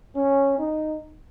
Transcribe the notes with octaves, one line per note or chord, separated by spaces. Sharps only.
C#4
D#4